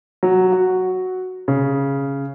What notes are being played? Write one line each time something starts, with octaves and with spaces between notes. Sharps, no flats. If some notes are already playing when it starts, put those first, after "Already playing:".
F#3
F#4
C#3